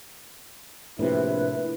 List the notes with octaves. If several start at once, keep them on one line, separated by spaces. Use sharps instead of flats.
A#1 A2 C3 E4 B4